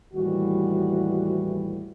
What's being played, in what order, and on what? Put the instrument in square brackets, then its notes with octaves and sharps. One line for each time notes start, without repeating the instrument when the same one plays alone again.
[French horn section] D#2 A2 E3 G3 F#4